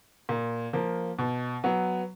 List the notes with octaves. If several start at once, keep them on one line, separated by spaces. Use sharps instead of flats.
A#2
F3 A#3
B2
F#3 B3